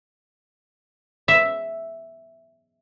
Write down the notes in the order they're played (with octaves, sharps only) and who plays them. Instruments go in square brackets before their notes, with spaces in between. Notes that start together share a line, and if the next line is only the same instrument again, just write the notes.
[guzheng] E5